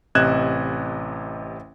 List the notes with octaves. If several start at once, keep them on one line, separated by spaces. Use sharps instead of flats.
A1 C3 D#5 F#6 G#6 E7